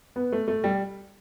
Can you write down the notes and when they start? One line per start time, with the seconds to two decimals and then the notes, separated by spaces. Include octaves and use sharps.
0.16 B3
0.32 A3
0.48 A3
0.64 G3